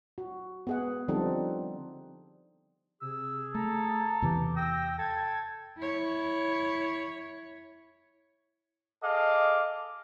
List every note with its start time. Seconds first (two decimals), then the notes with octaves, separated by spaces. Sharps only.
0.18 F#4
0.67 B3 G#4 F#5
1.08 D3 F3 G3 C4 D#4 A4
3.02 C3 G#4 E6
3.55 A3 A4 A#5
4.22 E2 C3 E3 G4
4.56 G5 E6 A#6
4.99 A4 G5 G#6
5.77 E4 C#5
9.02 G#4 A4 D#5 F5 D6